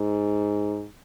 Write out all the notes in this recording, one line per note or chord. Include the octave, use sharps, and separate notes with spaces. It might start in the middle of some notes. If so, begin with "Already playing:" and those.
Already playing: G#2